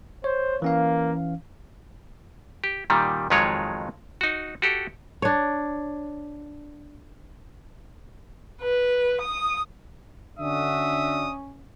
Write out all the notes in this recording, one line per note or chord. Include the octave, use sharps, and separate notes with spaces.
C5 C#5
E3 A#3 C#4 F5
G4
A#2 D#3 G3
F2 D#3 F#3 G#3 F4 C#5
D#4 F#4
F#4 G4 A4
D4 C#5
B4
D#6
D3 C#4 D4 F#4 E5 D#6